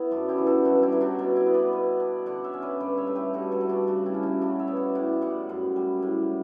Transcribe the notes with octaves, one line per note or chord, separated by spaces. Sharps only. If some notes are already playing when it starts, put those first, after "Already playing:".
Already playing: B3 E4
F#2 D4 F#4
E4 G4
E3
F#4 A4
G2 F#4 A4
E4 G4
F#3
D4 F#4
B2 D4
E4
B3
B4 D5
B2
D4
D3 D5 F#5
C#5 E5
C#4
B4 D5
G2 B4 D5
C#5 E5
A3
G4 B4
G2 F#4 A4
F#4 A4
A3
D4 F#4
C#3 D4 F#4
E4 G4
C#4
D4 F#4
C#3 D4 F#4
C#5 E5
B3
D5 F#5
A2 D5 F#5
G3 D5 F#5
F#2
G3
A2